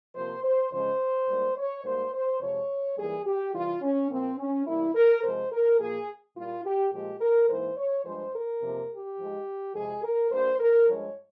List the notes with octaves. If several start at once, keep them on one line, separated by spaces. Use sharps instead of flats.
C3 F3 A#3 C5
C5
F2 C#3 F3 G#3 C5
G#2 G3 A#3
C#5
G#2 G3 A#3 C5
C5
F2 C3 F3 G#3 C#5
G#2 E3 G3 A#3 G#4
G4
C3 E3 G3 F4
C#4
A#2 F3 A#3 C4
C#4
E2 C3 G3 A#3 E4
A#4
C3 F3 G#3 C5
A#4
A#2 F3 A#3 G#4
A#2 G3 A#3 F4
G4
A#2 F3 G#3 G4
A#4
G#2 E3 A#3 C5
C#5
G2 F3 G#3 C5
A#4
F2 C3 F3 A#3
G4
G#2 F3 G#3
F2 C3 F3 G#3 G#4
A#4
G2 G3 A#3 C5
A#4
G2 F3 G#3 C#5